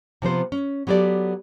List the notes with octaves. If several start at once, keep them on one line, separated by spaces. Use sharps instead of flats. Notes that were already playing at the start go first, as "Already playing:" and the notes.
C3 F3 B3 C5
C#4
F#3 B3 G4 A4 D5